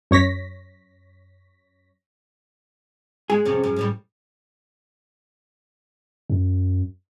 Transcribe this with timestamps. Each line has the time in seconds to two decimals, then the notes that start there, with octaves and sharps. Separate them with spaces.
0.11 F#2 C#5 A#6 B6
3.30 G#3 G#4
3.45 F2 C3 C#4
3.64 F#2
3.76 A2 E3 G3
6.30 F#2